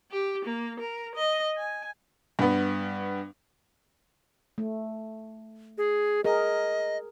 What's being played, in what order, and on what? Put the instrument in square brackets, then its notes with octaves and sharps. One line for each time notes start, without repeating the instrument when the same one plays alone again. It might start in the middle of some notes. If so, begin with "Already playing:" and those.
[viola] G4
A#3
A#4
D#5
G#5
[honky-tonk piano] G2 B3
[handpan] A3
[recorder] G#4
[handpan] G#4 A#4 [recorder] D#5